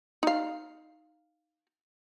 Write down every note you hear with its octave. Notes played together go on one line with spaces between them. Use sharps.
D#4 F5